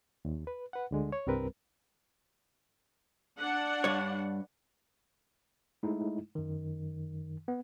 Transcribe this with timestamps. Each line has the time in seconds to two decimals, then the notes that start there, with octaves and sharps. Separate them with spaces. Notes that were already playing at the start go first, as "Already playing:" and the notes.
0.25 D#2
0.47 B4
0.73 B4 F#5
0.91 D2 D3 G#3
1.12 C#5
1.27 C2 G2 G3 C4 A#4 B4
3.39 D4 F#5
3.84 G2 C#5
5.83 G#3 A3 D#4 E4
6.35 F#2 D#3
7.48 B3